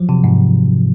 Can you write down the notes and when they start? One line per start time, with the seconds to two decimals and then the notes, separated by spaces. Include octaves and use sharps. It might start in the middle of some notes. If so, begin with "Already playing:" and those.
Already playing: F3 F#3
0.09 C3
0.24 G#2